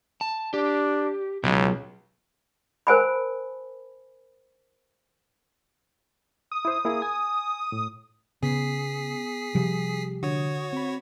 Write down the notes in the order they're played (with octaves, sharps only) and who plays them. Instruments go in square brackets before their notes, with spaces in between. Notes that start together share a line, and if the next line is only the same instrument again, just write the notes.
[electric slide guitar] A5
[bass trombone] D4 [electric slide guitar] G4
[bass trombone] C#2 [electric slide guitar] B2 F#3
[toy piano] A#4 C5 F#5 G#5 A5 B5
[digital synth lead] D#6
[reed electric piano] E4 C5
A#3 E4 G#4
G#5
A2
[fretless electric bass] C#3 [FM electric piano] B3 [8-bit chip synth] G#4 B6 C7
[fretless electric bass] C3 F3 G3 [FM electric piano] G4
[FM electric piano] D3 D#6 [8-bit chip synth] F#4 C#5
[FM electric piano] C4 B5